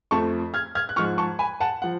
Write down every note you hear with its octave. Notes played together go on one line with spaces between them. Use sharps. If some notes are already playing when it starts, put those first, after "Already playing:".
F2 F3 A3 A5 C#6
F6 G#6
F6 G#6
F#6
G#2 F3 G#3 C#6 F6
A5 C#6
G#5 B5
F#5 A5
F3 F#5